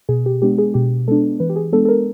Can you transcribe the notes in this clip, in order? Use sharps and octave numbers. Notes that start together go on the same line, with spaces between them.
B2 G#4
G4
G#3 B3 D4 G4
G#4
B2 G4
G#3 B3 D4 A4
E3 B4
G4
G#4
G#3 B3 D4 A4
A4
A#4